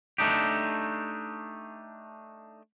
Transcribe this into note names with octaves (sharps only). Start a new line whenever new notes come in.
A3 D4 D#4 G4